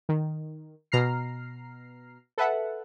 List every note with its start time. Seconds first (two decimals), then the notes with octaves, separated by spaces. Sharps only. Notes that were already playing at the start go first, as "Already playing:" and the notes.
0.09 D#3
0.92 B2 A#5 F6 C7
2.38 A4 B4 E5 F#5